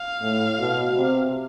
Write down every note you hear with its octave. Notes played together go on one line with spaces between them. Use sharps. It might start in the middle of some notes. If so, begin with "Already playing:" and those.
Already playing: F5
A2
B2
C3